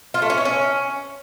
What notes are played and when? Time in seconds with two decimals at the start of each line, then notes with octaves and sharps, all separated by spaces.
0.14 F4
0.22 A3
0.30 C#4
0.38 E4
0.45 C#4